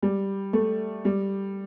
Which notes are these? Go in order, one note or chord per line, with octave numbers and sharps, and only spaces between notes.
G3
A3
G3